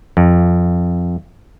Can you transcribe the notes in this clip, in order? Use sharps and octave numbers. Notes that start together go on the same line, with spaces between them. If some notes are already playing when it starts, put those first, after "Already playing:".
F2